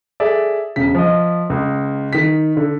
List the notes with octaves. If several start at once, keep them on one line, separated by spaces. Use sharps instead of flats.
G#4 A4 D5 E5
E1 C#3 B6
F3 D#5
C#2
D#3 B6
D3